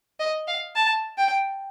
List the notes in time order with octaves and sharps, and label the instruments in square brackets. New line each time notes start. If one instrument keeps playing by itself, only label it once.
[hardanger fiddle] D#5
F5
A5
G5